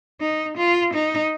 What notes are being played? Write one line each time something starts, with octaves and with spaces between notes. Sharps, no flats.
D#4
F4
D#4